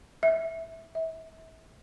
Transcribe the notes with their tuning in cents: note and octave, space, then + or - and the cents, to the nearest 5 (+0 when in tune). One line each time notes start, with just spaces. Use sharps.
E5 -5
E5 -35